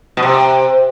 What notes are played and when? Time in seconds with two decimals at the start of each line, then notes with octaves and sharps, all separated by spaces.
0.17 B2
0.23 C3